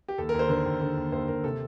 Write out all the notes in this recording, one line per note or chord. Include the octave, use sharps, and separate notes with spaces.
G4
D#2 A4
D#2 A#4
C5
D3 A#4
D#2
D3
D#2
D#2 C5
D#2 A#4
C3 A4